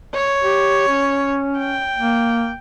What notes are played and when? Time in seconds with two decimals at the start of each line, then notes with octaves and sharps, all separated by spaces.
0.14 C#5
0.43 G4
0.88 C#4
1.58 G5
1.97 A#3